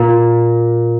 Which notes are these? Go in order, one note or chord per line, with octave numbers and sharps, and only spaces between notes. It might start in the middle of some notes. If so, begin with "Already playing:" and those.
Already playing: A#2